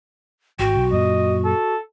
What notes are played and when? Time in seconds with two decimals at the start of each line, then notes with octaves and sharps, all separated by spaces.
0.59 G#1 F#4 G5
0.76 B1
0.92 F#2 A#2 D#5
1.44 A4